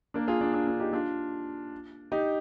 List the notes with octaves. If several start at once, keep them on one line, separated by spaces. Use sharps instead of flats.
A#3 D4
F4 G#4
D4 F4
D4 F4
D4 F4
D#4 G4
D4 F4
D#4 G4